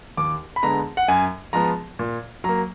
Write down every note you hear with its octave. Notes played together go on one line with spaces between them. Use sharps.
D#2 D6
B5
D3 G#3 B3 A#5
F#5
F#2 G#5
F3 G#3 B3 A#5
A#2
F#3 A#3 A#5